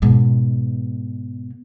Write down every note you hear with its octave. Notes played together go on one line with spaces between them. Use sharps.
G#2 B2